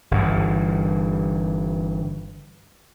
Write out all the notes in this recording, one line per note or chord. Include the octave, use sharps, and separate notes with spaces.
G1 G2 E3